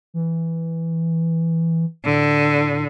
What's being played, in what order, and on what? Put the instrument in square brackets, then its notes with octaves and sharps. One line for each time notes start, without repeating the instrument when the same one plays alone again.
[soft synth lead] E3
[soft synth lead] A2 [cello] D3